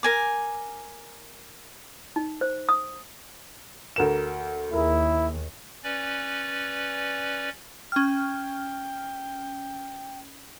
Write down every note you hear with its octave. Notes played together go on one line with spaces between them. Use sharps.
A#4 G#5 D6
D#4
C5
D#6
D2 A#4 E7
D#2 E4 G#4 A#4
C#4 B4 D5
C#4 G5 F6